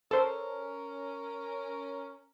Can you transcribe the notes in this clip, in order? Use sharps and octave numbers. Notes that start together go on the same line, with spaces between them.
C#4 A4 A#4 C5